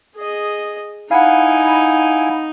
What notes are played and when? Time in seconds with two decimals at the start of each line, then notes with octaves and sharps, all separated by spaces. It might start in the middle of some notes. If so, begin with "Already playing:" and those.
0.16 G#4 D#5
1.11 D#4 E4 F5 F#5 G#5